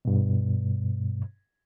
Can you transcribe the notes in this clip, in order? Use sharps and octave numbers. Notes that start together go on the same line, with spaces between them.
G2 B2